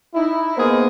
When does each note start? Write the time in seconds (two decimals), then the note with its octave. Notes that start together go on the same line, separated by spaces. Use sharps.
0.15 D#4 E4
0.57 A#3 B3 D#4 G#4 A#4 C5